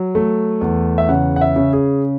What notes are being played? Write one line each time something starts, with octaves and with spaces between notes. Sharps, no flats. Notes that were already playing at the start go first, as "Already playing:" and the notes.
Already playing: F#3
A3
E2
E5
C#3 F#5
F#5
E5
C#3
G#4